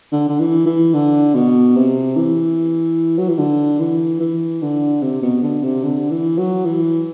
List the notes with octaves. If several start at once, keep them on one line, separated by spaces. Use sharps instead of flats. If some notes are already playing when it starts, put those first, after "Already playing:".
D3
D3
E3
E3
D3
B2
C3
E3
F#3
E3
D3
E3
E3
D3
C3
B2
D3
C3
D3
E3
F#3
E3